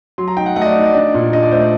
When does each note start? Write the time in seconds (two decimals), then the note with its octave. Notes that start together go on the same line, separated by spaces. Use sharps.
0.18 F#3 C6
0.28 A#5
0.37 D#4 G5
0.46 F#5
0.56 A3 F#5
0.62 D#5
0.65 D5
0.75 D#4
0.86 D5
0.94 D4
1.14 A#2
1.33 D4 D#5
1.43 D5
1.52 A3 C5
1.61 D5